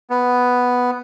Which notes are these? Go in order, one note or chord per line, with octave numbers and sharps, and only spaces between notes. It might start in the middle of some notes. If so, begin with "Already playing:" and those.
B3